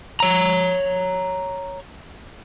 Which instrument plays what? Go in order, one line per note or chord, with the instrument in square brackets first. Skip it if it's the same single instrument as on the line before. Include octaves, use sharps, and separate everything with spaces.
[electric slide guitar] C#5 A#5